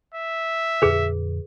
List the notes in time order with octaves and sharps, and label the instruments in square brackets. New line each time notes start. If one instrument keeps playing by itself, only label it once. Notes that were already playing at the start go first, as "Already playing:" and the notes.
[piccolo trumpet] E5
[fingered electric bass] F2 A#2 D3 [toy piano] G#4 B4